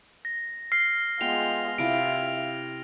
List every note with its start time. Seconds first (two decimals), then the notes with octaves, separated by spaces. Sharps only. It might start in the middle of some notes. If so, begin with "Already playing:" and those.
0.25 A#6
0.72 F6 C7
1.21 G#3 B3 F4 G5 F7
1.78 C3 E4 F4 E5 F5 D7